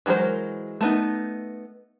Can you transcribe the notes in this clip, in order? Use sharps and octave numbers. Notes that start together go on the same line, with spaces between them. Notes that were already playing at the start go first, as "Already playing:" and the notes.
E3 F#3 G#3 A#4 C5
A3 B3 D#4